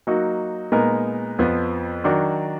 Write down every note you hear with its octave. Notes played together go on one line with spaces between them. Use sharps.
F#3 A#3 D#4 F#4
A#2 G#3 B3 D#4 A#4
F2 F3 B3
D#3 F#3 D4 F#4